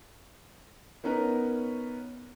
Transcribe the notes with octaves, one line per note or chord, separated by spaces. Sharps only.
B3 C#4 D#4 A#4 B4